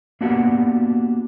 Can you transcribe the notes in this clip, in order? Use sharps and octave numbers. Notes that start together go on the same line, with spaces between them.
A#3 B3 D4 F#4 G4 F#5